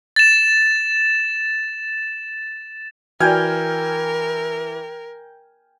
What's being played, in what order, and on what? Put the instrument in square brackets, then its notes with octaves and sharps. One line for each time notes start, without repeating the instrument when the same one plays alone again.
[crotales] A6 E7
[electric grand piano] E3 F6 G#6 [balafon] F#4 D5 [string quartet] A#4 [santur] G5 G#5